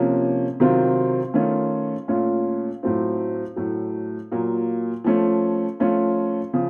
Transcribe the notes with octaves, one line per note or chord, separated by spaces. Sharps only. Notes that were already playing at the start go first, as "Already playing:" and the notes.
Already playing: C3 F3 A#3 C#4
C3 D#3 F#3 C4 F4
D#3 A3 C#4 F4
A#2 A3 C#4 F4
A2 F#3 A3 C4 F4
A2 F#3 A3
A#2 F#3 A#3
F3 A3 C#4 F4
F3 A3 C#4 F4
C#3 F3